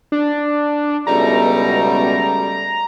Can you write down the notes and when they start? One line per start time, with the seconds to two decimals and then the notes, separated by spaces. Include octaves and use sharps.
0.12 D4
1.07 C#2 B2 G3 A3 A#5